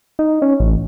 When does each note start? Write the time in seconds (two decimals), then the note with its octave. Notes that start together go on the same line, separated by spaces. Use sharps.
0.19 D#4
0.42 C#4
0.60 A1